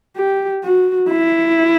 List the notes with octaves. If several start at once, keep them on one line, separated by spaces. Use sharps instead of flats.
G4
F#4
E4